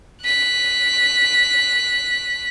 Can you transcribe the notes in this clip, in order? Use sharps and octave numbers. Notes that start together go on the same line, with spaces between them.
F#6 B6